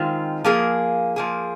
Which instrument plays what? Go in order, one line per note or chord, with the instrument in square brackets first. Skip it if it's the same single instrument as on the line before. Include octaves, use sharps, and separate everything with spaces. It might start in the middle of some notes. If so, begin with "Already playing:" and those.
Already playing: [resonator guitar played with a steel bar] D#3 G#3 C4 F4
F3 A#3 G#4
F3 A#3 G#4